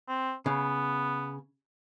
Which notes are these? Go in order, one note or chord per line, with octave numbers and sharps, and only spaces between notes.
C4
C#3 B3